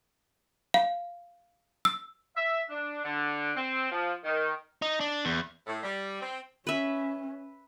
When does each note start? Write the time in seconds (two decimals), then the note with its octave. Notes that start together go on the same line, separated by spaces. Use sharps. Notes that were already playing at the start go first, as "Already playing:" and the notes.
0.74 F5
1.85 E6
2.36 E5
2.69 D4
3.04 D3
3.56 C4
3.92 F3
4.24 D#3
4.82 D#4
5.01 D4
5.25 E2
5.67 A2
5.83 G3
6.21 C4
6.67 C#4 B4 E5